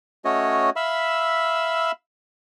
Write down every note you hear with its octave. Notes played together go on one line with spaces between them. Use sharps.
A3 C#4 F#4 C#5 D#5
E5 F5 B5 E6